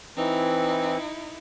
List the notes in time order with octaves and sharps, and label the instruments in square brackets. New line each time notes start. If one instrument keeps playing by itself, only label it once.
[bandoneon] E3 C4 [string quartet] D#4 E4